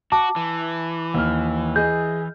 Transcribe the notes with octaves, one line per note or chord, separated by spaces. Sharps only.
F#4 A5 D6
E3
D#2 F6
G#4 D#5 G6